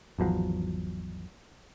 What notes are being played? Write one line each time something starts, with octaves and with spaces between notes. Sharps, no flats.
G#1 E2 F3 F#3